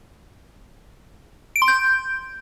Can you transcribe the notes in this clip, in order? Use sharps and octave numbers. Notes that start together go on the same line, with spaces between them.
D7
C6
G6